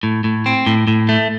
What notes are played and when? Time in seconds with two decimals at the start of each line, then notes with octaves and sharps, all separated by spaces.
0.03 A2
0.24 A2
0.46 C4
0.66 A2
0.87 A2
1.09 A3